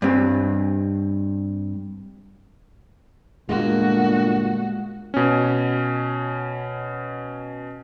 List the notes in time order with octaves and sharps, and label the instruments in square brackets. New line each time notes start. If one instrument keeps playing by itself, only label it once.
[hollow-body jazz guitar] G2 C4
[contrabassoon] G1 [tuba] A#2 [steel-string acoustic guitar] G#3 A#3 [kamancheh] F#4
[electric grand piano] B2 C#4